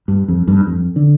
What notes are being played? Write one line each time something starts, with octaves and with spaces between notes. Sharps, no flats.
G2
F2
G2
F2
D3